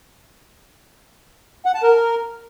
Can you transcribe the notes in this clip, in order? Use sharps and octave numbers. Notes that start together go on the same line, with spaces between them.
F#5
A5
A#4